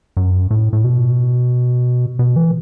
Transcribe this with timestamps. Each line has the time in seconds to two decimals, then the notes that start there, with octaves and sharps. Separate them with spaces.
0.17 F#2
0.51 A2
0.73 A2
0.84 B2
2.19 B2
2.36 E3